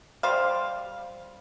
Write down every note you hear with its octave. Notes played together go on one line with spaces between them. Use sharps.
G3 C5 F5